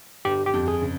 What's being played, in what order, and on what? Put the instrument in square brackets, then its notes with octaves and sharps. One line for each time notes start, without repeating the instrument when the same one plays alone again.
[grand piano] G1 [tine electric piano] G4
[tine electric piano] G4
[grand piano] F2
[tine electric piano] G#4
[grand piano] C#3